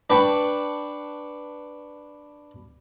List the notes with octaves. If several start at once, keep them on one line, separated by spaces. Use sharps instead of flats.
D4 B4 G5 A5 B5 C#6